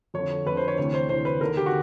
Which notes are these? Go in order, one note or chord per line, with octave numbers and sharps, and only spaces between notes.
F2 D3 C#5
F2 D3 B4
C5
C#5
D2 C3 E3 C#5
C5
D2 C3 E3 C5
B4
D#2 D3 A#4
G4
F#4